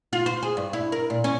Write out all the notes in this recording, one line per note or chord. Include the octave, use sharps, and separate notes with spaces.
F4
C5
G#4
G2
E4
A#4
A#2
C#4